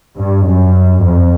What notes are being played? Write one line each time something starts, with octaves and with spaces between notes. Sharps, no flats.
G2
F#2
F2